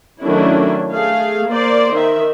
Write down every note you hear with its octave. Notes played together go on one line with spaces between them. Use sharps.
D#3 F#3 A3 C#4 D4 E4
A3 G#4 F5
A#3 C5 D5
D#3 E5